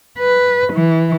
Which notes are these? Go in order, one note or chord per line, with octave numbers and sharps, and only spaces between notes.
B4
E3